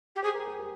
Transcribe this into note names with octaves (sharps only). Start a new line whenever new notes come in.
G4
G#4 C5
A#4
G#4
G4 A#4